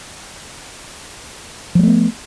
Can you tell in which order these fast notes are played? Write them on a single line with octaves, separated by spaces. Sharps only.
F3 G#3 A3 B3